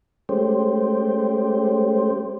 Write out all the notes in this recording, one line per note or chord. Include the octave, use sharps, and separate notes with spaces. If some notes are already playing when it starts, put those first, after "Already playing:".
G#3 A3 C#4 G4 C5